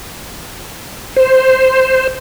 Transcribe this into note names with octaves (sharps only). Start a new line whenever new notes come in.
C5